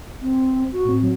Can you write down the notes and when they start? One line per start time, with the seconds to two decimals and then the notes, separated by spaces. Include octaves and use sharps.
0.22 C4
0.72 F#4
0.85 A2 C4
1.02 F#3